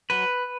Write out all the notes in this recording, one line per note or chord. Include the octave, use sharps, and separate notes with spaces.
F#3 B4